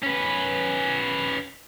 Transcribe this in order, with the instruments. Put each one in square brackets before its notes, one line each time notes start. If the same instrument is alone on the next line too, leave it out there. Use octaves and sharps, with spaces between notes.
[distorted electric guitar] C#4 B4